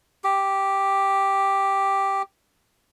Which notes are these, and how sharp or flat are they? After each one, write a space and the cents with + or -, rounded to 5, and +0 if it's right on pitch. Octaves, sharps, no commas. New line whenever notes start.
G4 +0